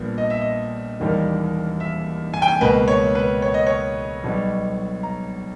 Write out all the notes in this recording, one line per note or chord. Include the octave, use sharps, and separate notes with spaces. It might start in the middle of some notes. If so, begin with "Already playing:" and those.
Already playing: A#1 A#2 G3 B3
D#5
E5
D#5
E1 D#2 D#3 G3 A#3
E5
G#5
G5
G#5
C#2 B2 A#3 B4
C#5
B4
C#5
D#5
C#5
B1 B2 G3 B3
A#5